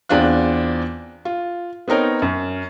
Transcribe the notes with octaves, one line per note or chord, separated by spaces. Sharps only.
E2 C4 D4 F4 F#6
F4
B3 C4 D#4 A#4 C#5
F#2